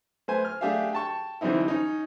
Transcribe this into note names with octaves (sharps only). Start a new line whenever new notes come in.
A3 B4 C5 G#5
F6
A3 D4 G4 G#4 E5 F5
G5 A5 C#6
D3 E3 G3 C4 D#4 E4
C#4 D#4